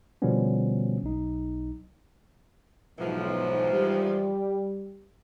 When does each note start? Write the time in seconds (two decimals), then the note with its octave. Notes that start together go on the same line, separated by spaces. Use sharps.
0.22 B2 D3 F3 G3 B3 C#4
1.03 B1 D#4
2.99 B1 G#2 E3 F3
3.72 G3 G4